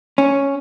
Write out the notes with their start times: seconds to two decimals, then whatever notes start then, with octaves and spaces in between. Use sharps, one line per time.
0.18 C#4